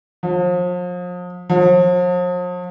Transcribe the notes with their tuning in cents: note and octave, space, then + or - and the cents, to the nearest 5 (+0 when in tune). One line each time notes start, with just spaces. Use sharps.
F3 +40
F3 +45